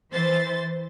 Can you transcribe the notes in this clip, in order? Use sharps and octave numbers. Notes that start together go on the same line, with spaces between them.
E3 C5 A6